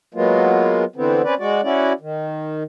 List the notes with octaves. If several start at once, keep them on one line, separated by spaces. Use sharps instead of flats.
F#3 G#3 A#3 B3 F4
D3 E3 B3 C4
C4 C#4 B4 D5
G#3 F#4 D5
C#4 E4 F#4 D5
D#3